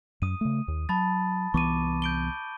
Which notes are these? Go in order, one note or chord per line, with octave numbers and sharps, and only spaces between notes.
F#2 D#6 D#7
C#3 A3
D#2
F#3 A5 B5 A6
C2 E3 B3 C#6 D6 D#7
G6 D7 G7